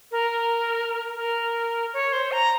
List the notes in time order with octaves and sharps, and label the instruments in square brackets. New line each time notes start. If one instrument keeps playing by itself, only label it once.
[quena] A#4
A#4
C#5
C5
A#5